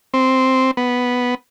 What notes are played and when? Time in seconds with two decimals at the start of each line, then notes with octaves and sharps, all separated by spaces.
0.14 C4
0.77 B3